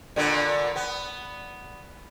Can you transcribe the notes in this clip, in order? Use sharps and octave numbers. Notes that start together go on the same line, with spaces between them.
A#2 D3 B3
B3